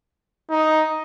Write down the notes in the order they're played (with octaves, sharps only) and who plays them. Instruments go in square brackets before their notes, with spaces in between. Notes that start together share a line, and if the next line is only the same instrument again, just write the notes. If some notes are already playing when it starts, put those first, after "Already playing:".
[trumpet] D#4